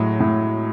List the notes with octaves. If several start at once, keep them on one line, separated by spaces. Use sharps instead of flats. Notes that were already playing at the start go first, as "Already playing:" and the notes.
Already playing: A2 F#3 G#3
A2